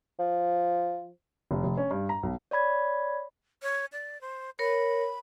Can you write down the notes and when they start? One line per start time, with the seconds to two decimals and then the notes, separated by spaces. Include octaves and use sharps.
0.19 F3
1.51 F1
1.64 F1
1.77 C#4
1.91 G2
2.09 A#5
2.23 B1
2.51 C#5 D5 B5 G#6
3.62 C#5
3.92 D5
4.21 C5
4.59 A#4 C#5 B5